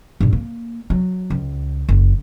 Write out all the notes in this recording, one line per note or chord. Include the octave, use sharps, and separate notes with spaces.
G2 A#2
A#3
F#3
C#2
F#1